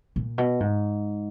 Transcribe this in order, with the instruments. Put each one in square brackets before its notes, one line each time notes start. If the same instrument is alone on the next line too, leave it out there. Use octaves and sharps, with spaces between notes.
[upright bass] A#2
B2
G#2